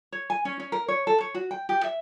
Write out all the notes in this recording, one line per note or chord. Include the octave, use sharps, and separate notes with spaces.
C#5
G#5
C#4
C#4
A#4
C#5
A4
C#5
F#4
G5
G4
E5